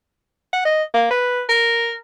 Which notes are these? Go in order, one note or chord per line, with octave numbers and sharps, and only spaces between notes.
F#5
D#5
A#3
B4
A#4